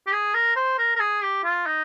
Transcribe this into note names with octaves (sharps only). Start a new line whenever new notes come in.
G4
G#4
A#4
C5
A#4
A#4
G#4
G4
F4
D#4